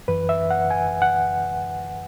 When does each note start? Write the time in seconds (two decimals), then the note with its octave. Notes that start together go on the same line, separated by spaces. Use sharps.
0.08 F#2 E3 B4
0.29 E5
0.50 F#5
0.71 G#5
1.02 F#5